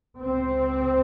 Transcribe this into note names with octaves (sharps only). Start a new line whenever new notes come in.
C#2 C3 C4